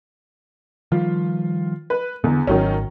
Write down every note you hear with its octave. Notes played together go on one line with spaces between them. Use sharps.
D#3 F3 G3 F4
B4
E2 B2 D3
G#1 D#3 F#3 C#4